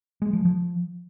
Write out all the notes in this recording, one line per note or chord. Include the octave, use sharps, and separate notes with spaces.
G#3
F3
F3